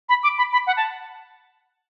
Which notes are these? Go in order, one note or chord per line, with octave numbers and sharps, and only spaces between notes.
B5
D6
B5
B5
F#5
A5